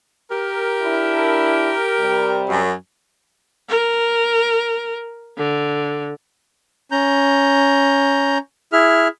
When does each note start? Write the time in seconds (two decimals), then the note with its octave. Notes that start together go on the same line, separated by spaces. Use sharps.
0.30 G4 A#4
0.82 D4 E4
2.00 C3 G3
2.49 F#2
3.69 A#4
5.37 D3
6.91 C#4 A#5 G6
8.73 E4 G#4 E5 F6